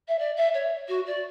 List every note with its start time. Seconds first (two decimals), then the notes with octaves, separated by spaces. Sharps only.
0.08 E5
0.19 D5
0.36 E5
0.54 C#5
0.88 F#4
1.06 D5